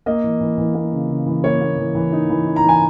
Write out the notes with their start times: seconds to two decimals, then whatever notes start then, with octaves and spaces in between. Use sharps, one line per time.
0.06 A#3 D#5
0.24 E3
0.41 E3
0.58 E3
0.75 A#3
0.93 C#3
1.09 C#3
1.26 E3
1.44 A#3 C#5
1.61 A#3
1.78 E3
1.95 E3
2.13 D#4
2.30 E3
2.47 D#4
2.56 A#5
2.64 E3
2.69 G#5